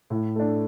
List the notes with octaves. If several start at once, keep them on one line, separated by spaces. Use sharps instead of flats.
A2
A3 D4